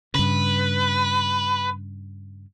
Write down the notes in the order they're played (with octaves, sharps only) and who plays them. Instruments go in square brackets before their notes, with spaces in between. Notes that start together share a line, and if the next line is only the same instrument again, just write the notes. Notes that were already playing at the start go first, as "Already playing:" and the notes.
[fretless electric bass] G2 C#3 [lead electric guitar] B4